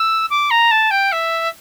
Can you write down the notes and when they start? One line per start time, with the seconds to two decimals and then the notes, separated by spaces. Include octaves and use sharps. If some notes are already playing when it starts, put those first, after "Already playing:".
Already playing: E6
0.30 D6
0.50 A#5
0.71 A5
0.90 G5
1.12 E5